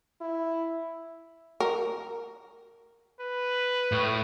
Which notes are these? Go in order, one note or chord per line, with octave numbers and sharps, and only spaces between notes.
E4
A#4
B4
A2